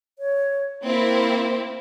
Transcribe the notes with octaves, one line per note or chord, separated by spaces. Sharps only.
C#5
A#3 C4 E4